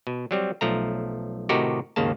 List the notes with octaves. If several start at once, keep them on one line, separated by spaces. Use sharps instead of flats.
B2
F#3 G3 C4
B1 F3 A3 A#5
A2 C3 D#3 D#4 F#4 G4
G#1 D#2 C#3 A#3 A5